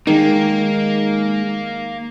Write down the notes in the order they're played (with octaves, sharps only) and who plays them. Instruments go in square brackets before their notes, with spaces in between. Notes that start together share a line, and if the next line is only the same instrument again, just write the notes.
[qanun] D#3 [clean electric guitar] G#3 D#4 [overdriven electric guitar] A#3